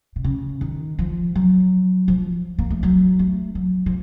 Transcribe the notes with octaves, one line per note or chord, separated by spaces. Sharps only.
C3
C#3
D#3
F3
F#3
F3
A#3
A3
F#3
A3
F#3
F3